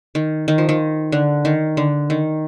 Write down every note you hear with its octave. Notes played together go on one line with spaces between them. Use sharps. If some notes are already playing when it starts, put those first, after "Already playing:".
D#3
D#3
F3
D#3
D3
D#3
D3
D#3